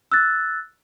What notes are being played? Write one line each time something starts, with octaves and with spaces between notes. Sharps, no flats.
E6 F#6 A6